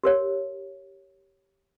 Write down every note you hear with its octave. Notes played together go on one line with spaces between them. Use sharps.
G4 A#4 C#5